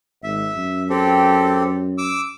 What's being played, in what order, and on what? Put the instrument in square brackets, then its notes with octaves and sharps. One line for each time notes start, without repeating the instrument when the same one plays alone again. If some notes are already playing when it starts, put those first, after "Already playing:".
[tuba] G#1 [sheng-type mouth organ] E5
[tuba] F#2
[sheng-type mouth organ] C4 G4 A4
D6 E6